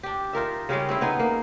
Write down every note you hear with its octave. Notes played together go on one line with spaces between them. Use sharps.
D4 G4
D#4 F4 A#4 E5
C#3 G3 G#3 C#4
C4 C#4 E4
B3 D#4 G#4
A#3